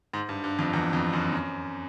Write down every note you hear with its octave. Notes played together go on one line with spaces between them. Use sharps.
G#2
G2
G2
F2
E2
F2
F#2
F#2